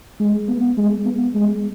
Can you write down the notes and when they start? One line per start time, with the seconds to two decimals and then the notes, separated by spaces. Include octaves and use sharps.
0.20 G#3
0.49 B3
0.77 G#3
1.06 B3
1.35 G#3